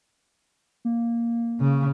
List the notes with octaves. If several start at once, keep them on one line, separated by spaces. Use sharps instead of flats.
A#3
C#3